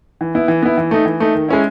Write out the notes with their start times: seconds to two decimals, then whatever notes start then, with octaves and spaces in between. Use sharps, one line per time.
0.21 E3
0.35 B3 E4
0.48 E3
0.63 B3 E4
0.77 E3
0.91 A3 D#4
1.06 E3
1.20 A3 D#4
1.35 D#3
1.49 G#3 C#4 E4